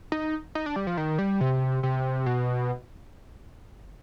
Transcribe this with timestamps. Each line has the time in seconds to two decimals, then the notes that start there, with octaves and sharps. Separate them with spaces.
0.12 D#4
0.55 D#4
0.66 D4
0.76 G3
0.87 F3
0.97 D#3
1.18 G3
1.41 C3
1.83 C3
2.26 B2